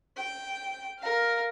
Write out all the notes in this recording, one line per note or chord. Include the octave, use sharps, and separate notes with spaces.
G5
A#4 F5